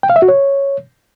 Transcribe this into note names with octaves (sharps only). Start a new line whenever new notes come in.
G5
F5
E5
F#4
C#5